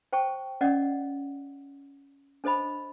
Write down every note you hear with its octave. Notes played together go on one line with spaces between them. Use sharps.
C5 G5 A5 C#6
C#4 D5 D#5 F#5
D4 A4 C5 D#5 B5